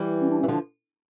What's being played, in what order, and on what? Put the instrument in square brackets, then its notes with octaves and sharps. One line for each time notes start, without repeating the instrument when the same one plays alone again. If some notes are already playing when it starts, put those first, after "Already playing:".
Already playing: [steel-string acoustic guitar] E3 G3
[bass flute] C#4
D4
C#4
[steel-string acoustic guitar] E3
[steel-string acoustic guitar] D3 F3 [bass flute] D4